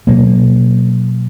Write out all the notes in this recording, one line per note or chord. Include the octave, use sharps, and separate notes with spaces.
B2 F#3 A#3